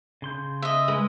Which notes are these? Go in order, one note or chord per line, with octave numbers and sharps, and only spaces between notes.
C#3 C6 G6
D#5 E5
G#3 B4